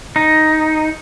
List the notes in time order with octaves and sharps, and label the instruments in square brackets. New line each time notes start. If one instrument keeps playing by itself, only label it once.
[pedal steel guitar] D#4